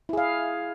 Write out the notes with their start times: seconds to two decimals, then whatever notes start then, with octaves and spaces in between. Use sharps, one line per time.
0.09 E4
0.13 G#4
0.18 F5